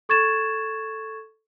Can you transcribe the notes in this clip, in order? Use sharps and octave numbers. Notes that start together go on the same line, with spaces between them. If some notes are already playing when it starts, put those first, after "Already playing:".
A4 C#6 G#6 A6 E7